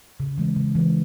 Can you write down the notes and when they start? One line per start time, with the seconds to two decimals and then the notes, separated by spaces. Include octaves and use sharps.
0.20 C#3
0.38 E3 G#3
0.56 C#3
0.75 E3 G#3